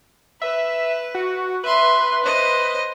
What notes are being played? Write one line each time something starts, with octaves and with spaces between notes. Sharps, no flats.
B4 E5
F#4
B4 E5 C6
C5 D#5